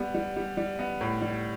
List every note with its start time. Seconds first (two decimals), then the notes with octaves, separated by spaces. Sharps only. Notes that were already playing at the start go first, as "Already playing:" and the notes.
Already playing: G3 B3
0.14 G3
0.36 G3
0.57 G3
0.79 B3
1.01 A2
1.22 G3